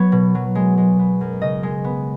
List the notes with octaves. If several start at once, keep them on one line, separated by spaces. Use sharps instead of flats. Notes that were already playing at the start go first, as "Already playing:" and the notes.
Already playing: F#3 B3 C#5
B2
F#3
G#3
G#3
B3
F#2
C#3 D#5
G#3
B3